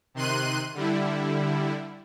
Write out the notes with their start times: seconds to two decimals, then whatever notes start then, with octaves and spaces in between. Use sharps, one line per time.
0.14 C3 D#3 C6 F#6 D#7
0.74 D3 G3 E4